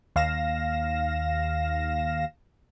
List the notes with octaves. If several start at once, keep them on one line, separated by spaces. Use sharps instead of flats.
D#2 F5 A#6 E7